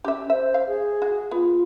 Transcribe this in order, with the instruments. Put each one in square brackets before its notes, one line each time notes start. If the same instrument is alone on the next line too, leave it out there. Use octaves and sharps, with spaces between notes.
[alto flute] C#4 [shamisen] G4 E5
[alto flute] C5 [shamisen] E5
[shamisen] F5
[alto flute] G#4
[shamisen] F#4
[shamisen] B3 [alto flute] F4